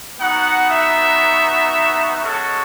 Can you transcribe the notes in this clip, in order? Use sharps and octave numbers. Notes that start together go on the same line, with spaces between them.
B3 D#4 F#4 F#5
E5
G#3 C#4 F#4 A4